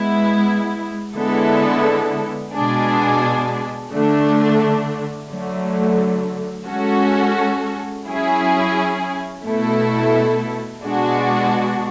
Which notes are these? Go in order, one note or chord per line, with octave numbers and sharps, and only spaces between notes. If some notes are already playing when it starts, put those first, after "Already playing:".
Already playing: G#3 B3 E4
D3 G#3 B3 E4 A4
B2 G#3 D4 G#4
D3 A3 D4
D3 F#3 A3
G#3 C#4 F#4 A4
F#3 C#4 E4 G#4
B2 A3 E4 A4
B2 G#3 D4 F#4